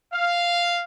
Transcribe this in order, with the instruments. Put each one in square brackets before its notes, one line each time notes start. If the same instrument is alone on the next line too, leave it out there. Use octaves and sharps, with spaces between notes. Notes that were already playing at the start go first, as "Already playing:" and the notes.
[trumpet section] F5